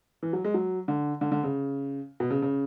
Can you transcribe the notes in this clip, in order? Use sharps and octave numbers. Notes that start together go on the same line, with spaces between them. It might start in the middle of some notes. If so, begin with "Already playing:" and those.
E3
F#3
G#3
F#3
D3
D3
D3
C#3
B2
C#3
C#3